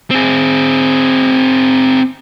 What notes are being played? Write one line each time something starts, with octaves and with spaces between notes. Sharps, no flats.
C4 G#4